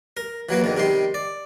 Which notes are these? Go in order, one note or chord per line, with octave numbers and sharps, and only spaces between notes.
A#4
E3 F#3 A#3 B4
E2 D3 D#3
C3 D#3 G3 C6
D5